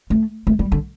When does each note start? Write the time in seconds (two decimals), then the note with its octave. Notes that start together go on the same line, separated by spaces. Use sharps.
0.10 A3
0.47 A3
0.59 G3
0.72 D3